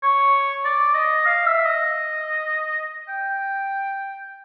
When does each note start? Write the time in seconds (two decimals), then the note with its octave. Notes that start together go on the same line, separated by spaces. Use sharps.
0.03 C#5
0.65 D5
0.94 D#5
1.26 F5
1.46 E5
1.66 D#5
3.09 G5